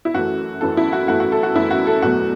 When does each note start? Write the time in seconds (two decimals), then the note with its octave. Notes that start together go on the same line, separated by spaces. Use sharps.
0.05 E4
0.14 F#2 E3 A3 F#4
0.61 F#2 E3 A3 A4
0.77 E4
0.93 F#4
1.08 F#2 E3 A3 F#4
1.20 F#4
1.32 A4
1.43 F#4
1.55 F#2 E3 A3 E4
1.71 F#4
1.87 A4
2.02 E2 B2 F#3 A3 F#4